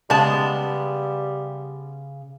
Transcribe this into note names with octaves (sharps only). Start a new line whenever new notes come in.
C#3 G3 G#3 B3 A5